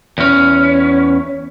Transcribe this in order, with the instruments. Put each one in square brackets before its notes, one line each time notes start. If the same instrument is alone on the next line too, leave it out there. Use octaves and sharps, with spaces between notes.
[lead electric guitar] E2 C#4